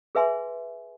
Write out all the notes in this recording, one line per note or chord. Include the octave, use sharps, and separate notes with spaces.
G#4 B4 E5 G#5 C6